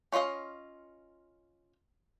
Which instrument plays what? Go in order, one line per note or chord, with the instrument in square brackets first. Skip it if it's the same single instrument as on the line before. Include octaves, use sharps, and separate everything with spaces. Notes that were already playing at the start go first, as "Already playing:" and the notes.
[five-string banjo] C#4 F4 C5 D#5 F5